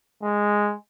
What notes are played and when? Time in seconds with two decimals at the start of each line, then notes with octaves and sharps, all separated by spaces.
0.23 G#3